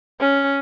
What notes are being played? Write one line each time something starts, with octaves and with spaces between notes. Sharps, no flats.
C#4